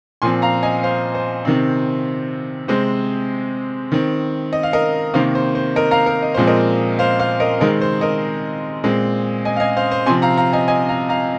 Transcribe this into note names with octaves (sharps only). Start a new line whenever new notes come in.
A#2 F3 C4 G#5 C6
F5 A#5
D#5 G#5
C5 F5
C5
C3 D#3 C4
C3 G#3 C4 C5
D#3 C4
D#5
F5
A#4 D#5
C3 D#3 A#3 C5 F5
C5
C5
A#4 D#5
F5 A#5
A#4
D#5
A#2 F3 G#3 C4 C5
A#4 D#5
C5 F5
C5 F5
A#4 D#5
C3 D#3 G#3 C4 A#4 D#5
C5
A#4 D#5
A#2 G#3 C4
D#5 G#5
F5
D#5 G#5
C5 F5
C5
C3 F3 C4 G#5 C6
F5 A#5
F5 A#5
D#5 G#5
D#5 G#5
F5 A#5
F5 A#5